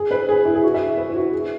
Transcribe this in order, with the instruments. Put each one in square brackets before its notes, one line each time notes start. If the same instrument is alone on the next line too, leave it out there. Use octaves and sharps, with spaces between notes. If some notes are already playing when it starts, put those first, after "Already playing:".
Already playing: [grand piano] G#4
B4
G#4
E4
G#4
F#4
E5
B4
E4
F#4
G#4